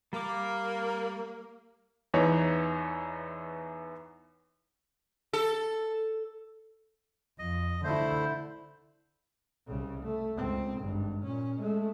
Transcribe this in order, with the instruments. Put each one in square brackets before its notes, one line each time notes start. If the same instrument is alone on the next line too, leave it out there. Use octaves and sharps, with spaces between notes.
[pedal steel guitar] G3 D6 [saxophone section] A#3
[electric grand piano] E2 E3 D#4 C#5
[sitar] A4
[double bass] F2 [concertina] D#5
[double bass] D3 E4 [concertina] A3 C5
[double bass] C2 C#3
A3
C#2 C4
G#1 G2
A#2 C#4
G#3 A3